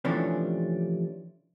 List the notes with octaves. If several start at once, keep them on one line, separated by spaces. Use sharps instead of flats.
C3 E3 F3 A3 C#4 D4